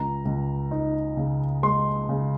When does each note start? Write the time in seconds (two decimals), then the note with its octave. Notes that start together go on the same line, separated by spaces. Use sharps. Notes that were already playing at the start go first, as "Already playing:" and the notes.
Already playing: C#2 A#5
0.25 C#2
0.71 D#4
1.17 C#3
1.63 G#3 C6
2.09 C#3